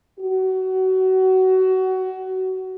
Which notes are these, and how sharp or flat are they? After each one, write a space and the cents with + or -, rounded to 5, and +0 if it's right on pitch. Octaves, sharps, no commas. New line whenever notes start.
F#4 +25